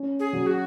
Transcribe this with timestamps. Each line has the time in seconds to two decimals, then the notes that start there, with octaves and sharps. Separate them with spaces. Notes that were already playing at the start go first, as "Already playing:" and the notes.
Already playing: C#4
0.19 G#4
0.33 F#3
0.46 F#4